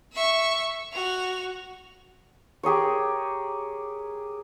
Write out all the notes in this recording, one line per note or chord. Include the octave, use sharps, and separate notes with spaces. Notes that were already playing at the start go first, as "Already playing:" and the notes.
E5 C#6
F#4 F7
G4 G#4 A#4 C#5